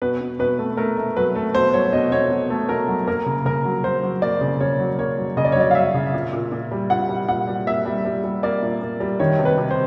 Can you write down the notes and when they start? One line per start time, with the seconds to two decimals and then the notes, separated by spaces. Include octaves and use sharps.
0.02 B2 B4
0.21 B2
0.39 B2 B4
0.59 A3
0.77 A3 A#4
0.97 A3
1.16 F#3 B4
1.35 A3
1.54 B2 C5
1.73 F#3 C#5
1.93 B2 D#5
2.12 B2 C#5
2.31 B2
2.50 A3
2.69 B2 A#4
2.88 F#3
3.08 A#3 A#4
3.26 C#3
3.45 C#3 A#4
3.65 F#3
3.84 F#3 C5
4.03 F#3
4.22 A#3 D5
4.41 C#3
4.60 C#3 C#5
4.80 F#3
4.99 A#3 C#5
5.17 F#3
5.37 C#3 D#5
5.45 D5
5.52 C#5
5.56 F#3 D5
5.71 F5
5.75 F#3 E5
5.94 C#3
6.14 A#2
6.33 A#2
6.52 A#2
6.72 G3
6.90 A#2 F#5
7.09 G3
7.28 A#2 F#5
7.48 G3
7.67 A#3 E5
7.85 G3
8.05 G3
8.24 G3
8.43 A#3 D5
8.62 A#2
8.82 A#3
9.00 G3
9.20 D#3 C#5
9.39 C3
9.45 B4
9.58 C3
9.71 C5